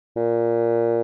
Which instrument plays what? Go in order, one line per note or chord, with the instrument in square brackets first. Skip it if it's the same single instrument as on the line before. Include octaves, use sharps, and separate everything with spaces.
[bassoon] A#2